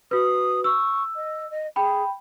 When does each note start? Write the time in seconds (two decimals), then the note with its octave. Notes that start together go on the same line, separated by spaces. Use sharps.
0.11 F#4 B4 D#6
0.64 C#6 E6
1.15 D#5
1.50 D#5
1.76 G#4 G5 B5